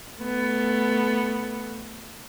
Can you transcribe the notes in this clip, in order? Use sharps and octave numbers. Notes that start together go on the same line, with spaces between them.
A3 B3